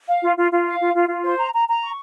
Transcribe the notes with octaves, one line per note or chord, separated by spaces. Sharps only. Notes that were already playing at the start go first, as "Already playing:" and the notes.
F5
F4
F4
F4
F5
F4
F4
F4
C5
A#5
A#5
A#5
C#6